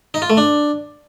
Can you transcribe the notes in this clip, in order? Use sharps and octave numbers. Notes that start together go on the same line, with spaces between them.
D#4
F4
A3
D4